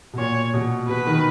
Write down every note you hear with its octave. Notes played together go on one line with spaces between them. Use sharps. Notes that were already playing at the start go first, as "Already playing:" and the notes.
B2
A#2 C#5
B2
B2 B4
D#3